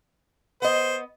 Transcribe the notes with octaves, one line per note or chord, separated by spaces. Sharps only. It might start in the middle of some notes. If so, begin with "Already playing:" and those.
B3 C5 D#5